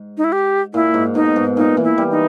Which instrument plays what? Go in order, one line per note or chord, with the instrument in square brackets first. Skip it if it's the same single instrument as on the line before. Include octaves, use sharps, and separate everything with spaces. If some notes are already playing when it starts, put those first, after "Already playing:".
Already playing: [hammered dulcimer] G#2
[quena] D#4
E4
G4
[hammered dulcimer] A#2 [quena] E4
[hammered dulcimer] G#2
[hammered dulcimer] B2 [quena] D#4
[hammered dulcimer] G#2
[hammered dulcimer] A#2 [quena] D#4
[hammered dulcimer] E3
[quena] E4
[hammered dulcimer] G3
[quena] D#4